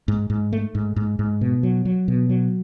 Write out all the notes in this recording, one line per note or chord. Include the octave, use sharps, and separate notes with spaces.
G#2
G#2
A3
G#2
G#2
G#2
B2
F#3
F#3
B2
F#3